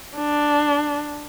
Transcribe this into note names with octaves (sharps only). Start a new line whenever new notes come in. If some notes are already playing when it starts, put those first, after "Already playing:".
D4